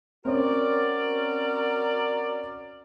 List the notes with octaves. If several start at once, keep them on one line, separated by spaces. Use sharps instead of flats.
C4 C#4 F#4 A#4 D5